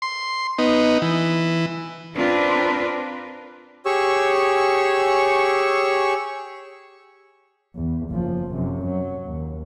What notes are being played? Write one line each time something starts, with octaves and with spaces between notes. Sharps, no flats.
C6
B3 D#4
E3
C4 D4 F4 A#4 B4
G4 G#4 C#5 C#6 E6
E2
F#1 F3
F#2 C3
F#3
D#2